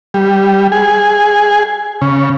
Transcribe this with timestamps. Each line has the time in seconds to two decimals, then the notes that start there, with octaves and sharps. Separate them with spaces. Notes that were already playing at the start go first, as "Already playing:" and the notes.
0.14 G3
0.72 G#4
2.01 C#3